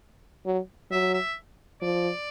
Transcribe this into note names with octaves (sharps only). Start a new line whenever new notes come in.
F#3
F#3 E5
E5
F3 D5